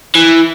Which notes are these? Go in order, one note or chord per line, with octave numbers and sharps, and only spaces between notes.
E3